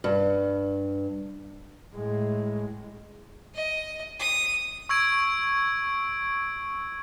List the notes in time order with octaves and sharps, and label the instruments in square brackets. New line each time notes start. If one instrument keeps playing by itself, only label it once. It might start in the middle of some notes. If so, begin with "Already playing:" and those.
[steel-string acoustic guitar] G2
[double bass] A2 G#3
[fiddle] D#5
D#6
[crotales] C#6 E6 G#6 D7